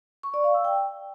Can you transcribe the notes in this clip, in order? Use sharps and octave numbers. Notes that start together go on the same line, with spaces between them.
C#6
D5
F5
E6
G5